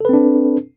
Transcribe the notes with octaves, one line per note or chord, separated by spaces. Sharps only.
C4 D4 A4 B4